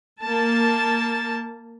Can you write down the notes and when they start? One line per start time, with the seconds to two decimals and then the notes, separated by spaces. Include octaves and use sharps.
0.21 A#3 A5